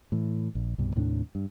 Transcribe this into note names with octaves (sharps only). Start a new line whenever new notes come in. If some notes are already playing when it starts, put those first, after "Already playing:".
A2 E3
A#1
C2 G2 B2
D#2 A2 C3 D4
G2